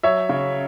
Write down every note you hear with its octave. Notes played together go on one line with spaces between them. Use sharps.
F#3 C#5 E5
C#3